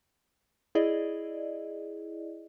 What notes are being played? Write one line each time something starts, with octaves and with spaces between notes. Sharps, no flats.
E4 G#4 D5 D#5